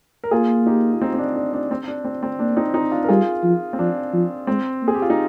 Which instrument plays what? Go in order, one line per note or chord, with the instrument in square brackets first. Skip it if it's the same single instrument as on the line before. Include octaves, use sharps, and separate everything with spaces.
[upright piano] A#4
[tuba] A#3 [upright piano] F4 G#4
[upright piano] D#4 G4
F4
C4 D#4
C4
D4
D4
D4
C4
D4
C4
C4
[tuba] A#3 [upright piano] D4
[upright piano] C4 D#4
C4 D#4
D4 F4
A#4
[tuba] G3 [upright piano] F4 G#4
[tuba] F3
[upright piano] C4
[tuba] F3 [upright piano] D4
[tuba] F3
[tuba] G#3 [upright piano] C4
[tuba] A#3
[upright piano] G#4
G4
F4
D#4